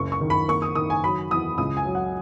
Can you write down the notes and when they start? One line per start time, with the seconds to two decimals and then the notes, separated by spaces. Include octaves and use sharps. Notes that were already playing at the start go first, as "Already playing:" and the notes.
Already playing: F#1 C#2 C#6
0.12 C#6
0.21 D#3
0.30 B5
0.48 A#3 C#6
0.62 D#6
0.75 D#3 D#6
0.90 G#5
1.03 F#3 B5
1.31 E2 D#6
1.58 C#2 D#6
1.77 G#5
1.85 F#3
1.95 F#5